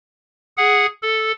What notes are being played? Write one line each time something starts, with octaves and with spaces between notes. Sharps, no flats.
G#4 F#5
A4